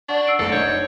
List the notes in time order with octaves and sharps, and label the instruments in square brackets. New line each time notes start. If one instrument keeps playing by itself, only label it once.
[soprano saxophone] D4 [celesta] D5 F#5 C#6
[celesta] E6 C7 D7
[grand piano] F#1 C2 A3 [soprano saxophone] A4
[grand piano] D4 D#4 [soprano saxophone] C#5 [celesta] G6